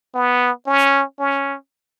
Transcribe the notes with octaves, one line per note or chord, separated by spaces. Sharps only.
B3
C#4
C#4